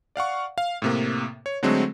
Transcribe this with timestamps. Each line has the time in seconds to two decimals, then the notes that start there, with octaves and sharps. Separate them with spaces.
0.16 D5 F5 F#5 C#6
0.58 F5
0.82 A2 C3 A#3
1.46 C#5
1.63 D3 F#3 G#3 A3 C4